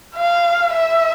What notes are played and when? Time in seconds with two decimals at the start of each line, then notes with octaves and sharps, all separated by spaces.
0.16 F5
0.73 E5